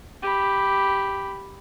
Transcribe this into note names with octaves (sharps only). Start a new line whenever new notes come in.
G4 B5